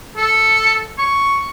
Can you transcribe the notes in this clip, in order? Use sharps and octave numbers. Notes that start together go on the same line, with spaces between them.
A4
C#6